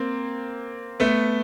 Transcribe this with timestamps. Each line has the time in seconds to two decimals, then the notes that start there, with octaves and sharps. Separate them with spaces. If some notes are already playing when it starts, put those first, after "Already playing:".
Already playing: A#3 C4
1.00 A3 B3